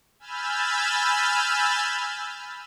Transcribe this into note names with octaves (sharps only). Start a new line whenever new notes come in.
G#5 B5 E6 F6 G6 A6